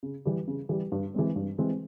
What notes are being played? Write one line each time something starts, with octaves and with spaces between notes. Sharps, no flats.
C#3
E3 G3
C#3
E3 G3
G2
E3 G#3 C4
G2
E3 G#3 C4